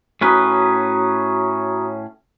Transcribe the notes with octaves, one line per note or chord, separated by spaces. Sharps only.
A2 C#4 F#4 B4 A#5 D#6